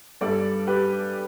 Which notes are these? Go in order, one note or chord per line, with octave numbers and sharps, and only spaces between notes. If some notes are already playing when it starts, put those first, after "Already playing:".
G2 G3 A4 D5
G4 B4